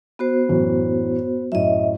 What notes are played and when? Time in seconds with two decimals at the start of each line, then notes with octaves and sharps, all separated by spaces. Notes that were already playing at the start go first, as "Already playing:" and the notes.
0.19 B3 F#4 C5
0.49 F#2 A2 E3
1.52 F#2 A2 D#5 E5